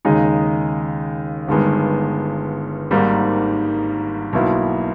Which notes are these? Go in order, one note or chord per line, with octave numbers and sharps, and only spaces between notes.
D#2 C#3 G#3 D#4
G1 G2 D#3 G#3 B3
G#1 G#2 D#3 G3 A#3
B1 B2 A#3 E4